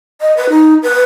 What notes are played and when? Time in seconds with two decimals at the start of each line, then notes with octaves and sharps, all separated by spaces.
0.21 D#5
0.37 B4
0.50 D#4
0.83 B4